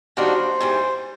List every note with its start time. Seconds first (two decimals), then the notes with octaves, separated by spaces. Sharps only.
0.17 D#3 G3 A#3 D4 F#4 C5
0.60 G#2 E3 G3